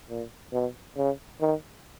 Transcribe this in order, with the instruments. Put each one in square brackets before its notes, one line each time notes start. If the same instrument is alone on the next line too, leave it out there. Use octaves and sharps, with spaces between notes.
[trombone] A#2
B2
C#3
D#3